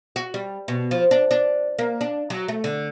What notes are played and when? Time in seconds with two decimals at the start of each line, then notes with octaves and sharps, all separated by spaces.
0.16 F#4
0.34 G3
0.68 B2
0.91 F3
1.11 D4
1.31 D4
1.79 A#3
2.01 D4
2.30 F#3
2.48 A3
2.64 D3